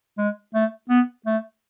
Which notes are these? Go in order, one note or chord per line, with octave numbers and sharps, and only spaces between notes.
G#3
A3
B3
A3